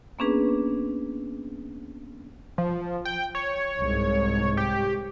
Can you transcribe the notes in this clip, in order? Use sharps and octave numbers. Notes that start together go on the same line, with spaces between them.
A#3 B3 C#4 D4 G#4 B4
F3
G5
C#5
C2 G#2
G4